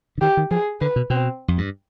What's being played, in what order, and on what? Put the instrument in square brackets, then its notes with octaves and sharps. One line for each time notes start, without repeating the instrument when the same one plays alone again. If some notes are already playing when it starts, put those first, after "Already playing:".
[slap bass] D3
[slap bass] D#3 [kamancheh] G4
[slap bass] D#3
[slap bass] F3 [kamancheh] G#4
[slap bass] D3 [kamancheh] B4
[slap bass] B2
[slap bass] B2 [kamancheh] C4
[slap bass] F2
G2